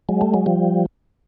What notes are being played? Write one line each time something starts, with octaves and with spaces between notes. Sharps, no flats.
F#3 G#3
G3 A3
F#3 G#3
F3 G3